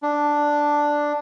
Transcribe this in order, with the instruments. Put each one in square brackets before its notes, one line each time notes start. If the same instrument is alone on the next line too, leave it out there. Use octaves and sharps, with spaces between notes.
[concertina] D4